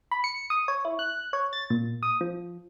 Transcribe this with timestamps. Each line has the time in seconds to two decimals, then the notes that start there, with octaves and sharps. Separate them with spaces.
0.11 B5
0.24 C#7
0.50 D#6
0.68 C#5
0.85 E4
0.99 F#6
1.33 C#5
1.53 A6
1.70 A#2
2.03 D#6
2.21 F3